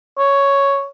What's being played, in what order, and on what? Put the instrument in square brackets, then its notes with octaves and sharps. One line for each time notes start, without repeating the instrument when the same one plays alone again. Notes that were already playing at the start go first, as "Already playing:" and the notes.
[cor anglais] C#5